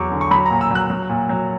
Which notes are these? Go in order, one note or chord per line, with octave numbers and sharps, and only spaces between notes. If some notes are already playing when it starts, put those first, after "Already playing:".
Already playing: E2 F#3 C#6 D6
D3
C#6
F#3 B5
A#5
A#2
E6
F#3 F#6
F#3
A#2
F#3